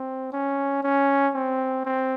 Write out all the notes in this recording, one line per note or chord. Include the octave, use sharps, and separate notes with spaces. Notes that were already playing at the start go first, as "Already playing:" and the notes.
Already playing: C4
C#4
C#4
C4
C4